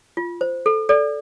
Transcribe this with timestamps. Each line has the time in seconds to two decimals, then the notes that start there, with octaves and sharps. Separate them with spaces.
0.17 F4
0.41 C5
0.66 A4
0.89 A4 D5